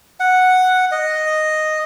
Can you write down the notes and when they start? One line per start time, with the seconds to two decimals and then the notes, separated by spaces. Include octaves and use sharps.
0.20 F#5
0.91 D#5